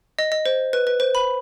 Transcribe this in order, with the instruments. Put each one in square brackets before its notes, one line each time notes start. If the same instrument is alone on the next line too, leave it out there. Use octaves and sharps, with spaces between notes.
[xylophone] D#5
D#5
C5
B4
B4
C5
B5